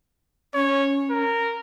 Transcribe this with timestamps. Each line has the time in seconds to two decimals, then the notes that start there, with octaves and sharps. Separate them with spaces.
0.54 C#4 C#5
1.11 A#4